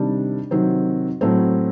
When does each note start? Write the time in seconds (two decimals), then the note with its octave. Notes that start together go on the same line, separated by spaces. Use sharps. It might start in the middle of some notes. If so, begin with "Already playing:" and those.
Already playing: C3 D#3 G3 D4
0.51 C3 D#3 F#3 C4
1.21 A2 F#3 A3 C4